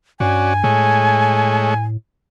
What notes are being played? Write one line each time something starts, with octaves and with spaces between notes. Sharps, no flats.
G2 C#4 F#4 D5 G#5
A2 G#3 A3 C#5